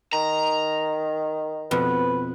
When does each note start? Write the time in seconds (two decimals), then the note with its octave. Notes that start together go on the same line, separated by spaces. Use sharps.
0.13 D#3 A#5
1.71 F2 B2 B4